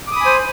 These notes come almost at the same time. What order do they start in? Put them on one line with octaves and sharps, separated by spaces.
D6 D#6 B5 G#5 C5